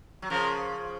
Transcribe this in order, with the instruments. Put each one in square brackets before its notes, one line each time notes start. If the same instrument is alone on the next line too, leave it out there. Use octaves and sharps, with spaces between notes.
[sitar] F#3
[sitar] C#3 F3 [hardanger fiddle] A#4